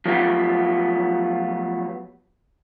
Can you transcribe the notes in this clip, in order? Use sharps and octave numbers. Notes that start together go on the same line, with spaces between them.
F3 F#3 A3 B3 F4 G4